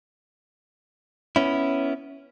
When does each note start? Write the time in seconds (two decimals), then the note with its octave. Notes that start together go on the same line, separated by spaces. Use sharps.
1.36 B3 C#4 E4